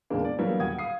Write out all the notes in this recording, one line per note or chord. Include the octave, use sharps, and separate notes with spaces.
E2 A#2 C#3 G#3 A#3 D4
D5
D3 E3 F#3 G3 A#3 B3
D#1 F#5 G5 D#6 G#6
F5 D#6 C7